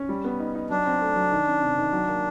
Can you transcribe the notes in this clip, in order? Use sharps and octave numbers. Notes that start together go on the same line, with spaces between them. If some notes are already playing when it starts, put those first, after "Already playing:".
Already playing: C#4
G3
B3
D#4
D#4
F#3 D4
C4
A3
F#3
D#3
C#4
C3
D#3
F#3
A#3